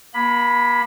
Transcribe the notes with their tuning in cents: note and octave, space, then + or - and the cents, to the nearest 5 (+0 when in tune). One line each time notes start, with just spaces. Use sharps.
A#3 +35 B5 +0